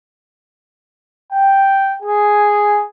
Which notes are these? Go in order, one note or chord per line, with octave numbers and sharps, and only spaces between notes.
G5
G#4